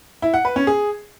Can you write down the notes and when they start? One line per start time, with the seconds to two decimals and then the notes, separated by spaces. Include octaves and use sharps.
0.22 E4
0.34 F#5
0.45 B4
0.56 C#4
0.67 G#4